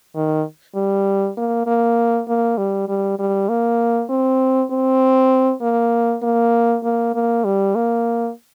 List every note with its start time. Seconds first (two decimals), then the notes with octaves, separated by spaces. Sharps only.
0.15 D#3
0.75 G3
1.37 A#3
1.67 A#3
2.28 A#3
2.58 G3
2.88 G3
3.19 G3
3.49 A#3
4.10 C4
4.71 C4
5.62 A#3
6.23 A#3
6.84 A#3
7.15 A#3
7.45 G3
7.75 A#3